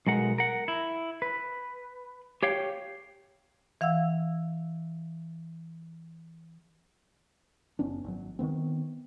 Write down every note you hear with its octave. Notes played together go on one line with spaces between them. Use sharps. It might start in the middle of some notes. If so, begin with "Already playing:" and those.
B1 G#3 A#4 F#5
A#4 F#5
E4
B4
G4 C#5 F5 G5
E3 F5 F#5 E6
F#1 B3 C#4 D4
G#1 F#3
D#3 F#3 B3 C4